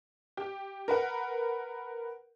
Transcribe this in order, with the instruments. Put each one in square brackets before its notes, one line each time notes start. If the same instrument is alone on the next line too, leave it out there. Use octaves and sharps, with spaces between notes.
[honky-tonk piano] G4
A#4 B4 F#5